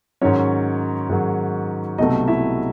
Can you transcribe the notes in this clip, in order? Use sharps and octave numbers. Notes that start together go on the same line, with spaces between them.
G#2 D#3 F#3 C#4 C#5
G#2 D#3 F#3
C2 B2 F#3 A3 D#4 D#5
E4 E5